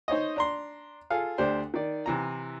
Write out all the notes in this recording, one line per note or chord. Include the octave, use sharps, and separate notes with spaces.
D#4 C5 C#5 D#5
D4 A#5 C6
F4 G#4 A4 F5
D2 D4 G4 C5
D#3 D5
C3 E3 A#5